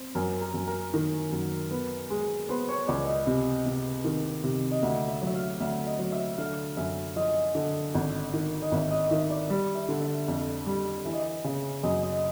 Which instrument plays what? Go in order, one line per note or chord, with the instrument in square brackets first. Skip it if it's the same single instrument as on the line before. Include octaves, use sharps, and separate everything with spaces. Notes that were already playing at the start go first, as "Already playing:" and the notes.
Already playing: [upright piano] C4
[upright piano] F#2 [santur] A#4
[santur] A#4
[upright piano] F#2
[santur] A#4
[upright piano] D#3
F#2
B3
G#3
[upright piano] B3 [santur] C5
[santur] C#5
[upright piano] C#2 [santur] D5
[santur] D#5
[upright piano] C3
C3
D#3
C3
[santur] D#5
[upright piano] D2 [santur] E5
[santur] E5
[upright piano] F#3 [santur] E5
[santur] F5
[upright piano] D2 [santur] E5
[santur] D#5
[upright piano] F#3
[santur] E5
[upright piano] D3 [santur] F5
[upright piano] F#2 [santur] E5
[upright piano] F3 [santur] D#5
[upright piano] D3
G#1
D#3
[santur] D#5
[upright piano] G#1 [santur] E5
[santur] D#5
[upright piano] D#3 [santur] E5
[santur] D5
[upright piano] G3 [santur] E5
[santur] E5
[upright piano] D3
[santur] E5
[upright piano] F2 [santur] F5
[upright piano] G3
[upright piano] E3 [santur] E5
[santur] D#5
E5
[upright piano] C#3
[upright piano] F#2 [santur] D#5
[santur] D#5